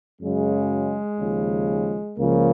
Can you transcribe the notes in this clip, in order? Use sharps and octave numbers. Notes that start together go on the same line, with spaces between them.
F#2 C#3 F#3 G#3
D#2 C#3 F3
C#2 C#3 F3 A#3